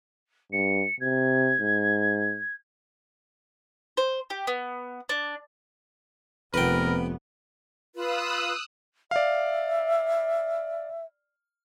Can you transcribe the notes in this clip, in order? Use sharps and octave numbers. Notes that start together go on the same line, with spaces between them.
G2 C#7
C3 G#6
G#2
C5
G4
B3
D4
F1 F2 B3 A#4 B4 G5
F4 B4 D#6 E6 F#6
D5 E5 F5